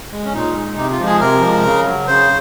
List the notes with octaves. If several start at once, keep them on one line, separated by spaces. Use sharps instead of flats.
G#3
C#4
A#2 D#4
G#3
C3 D#4
F4
F3 G#3
G#4
C3 A#4
F3 G#3
C#3
F#3
C#3 C5